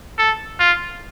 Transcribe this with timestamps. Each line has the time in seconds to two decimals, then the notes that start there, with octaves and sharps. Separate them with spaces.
0.19 A4
0.60 F4